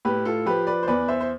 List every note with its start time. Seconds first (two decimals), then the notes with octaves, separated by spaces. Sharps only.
0.05 A2 G4 B4
0.25 F4 A4
0.46 F3 G4 B4
0.67 B4 D5
0.83 C5
0.87 E2 B4 D5
1.08 C5 E5
1.21 C5